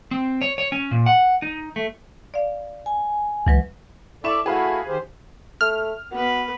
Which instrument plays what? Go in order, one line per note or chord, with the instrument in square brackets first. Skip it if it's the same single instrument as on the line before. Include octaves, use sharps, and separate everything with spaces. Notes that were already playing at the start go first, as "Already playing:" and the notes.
[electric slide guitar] C4
C#5
C#5
C#4
A#2
F#5
D#4
A3
[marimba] D5 F5
[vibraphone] G#5
[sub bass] C#2 [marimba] E3 F#3 B4
[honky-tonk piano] E4 C#6 E7 [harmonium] A4 D5
[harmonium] A3 E4 F#4 [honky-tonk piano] G#4 B4 F5
[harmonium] D#3 G4 C5
[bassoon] A3 [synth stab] F6
[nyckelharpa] B3 B4 [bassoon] F#4